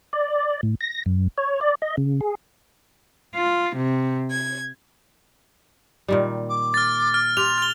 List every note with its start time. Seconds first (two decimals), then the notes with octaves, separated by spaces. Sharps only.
0.13 D5
0.63 A2
0.81 A#6
1.06 F#2
1.38 C#5
1.61 D5
1.82 D#5
1.97 C#3
2.21 G#4
3.34 F4
3.75 C3
4.30 G#6
6.08 A#2 D#3 G3
6.49 D6
6.74 F6 A6
7.14 F6
7.37 G4 C6 F7
7.58 F6 G7